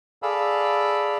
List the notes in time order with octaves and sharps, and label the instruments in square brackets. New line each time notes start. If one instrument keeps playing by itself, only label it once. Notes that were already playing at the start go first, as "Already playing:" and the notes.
[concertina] G#4 A4 D5 F5 B5 E6